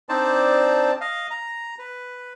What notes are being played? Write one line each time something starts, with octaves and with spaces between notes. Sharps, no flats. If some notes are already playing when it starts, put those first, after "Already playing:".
C4 D4 D#4 C5 D5 A5
D#5 F5
A#5
B4